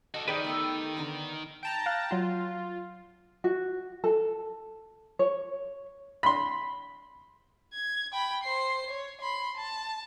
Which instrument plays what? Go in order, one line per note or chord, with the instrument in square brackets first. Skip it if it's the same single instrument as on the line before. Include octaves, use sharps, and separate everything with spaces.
[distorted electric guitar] F#4 A4 [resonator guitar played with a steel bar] D#5
[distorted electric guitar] D#3 [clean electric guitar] D#4 G4 B4 [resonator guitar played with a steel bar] G#4 C5 D5
[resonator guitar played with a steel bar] A3 B3 A4
D3 B3 A#5
[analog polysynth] G5 A5 A#5
[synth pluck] F5 F6 F#6
[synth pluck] F#3 F#5 [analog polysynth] F4
[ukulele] F#4
A4
C#5
[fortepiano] B5 C6
[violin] G#6
G5 B5
C5 C7
C#5
B5 C6
A5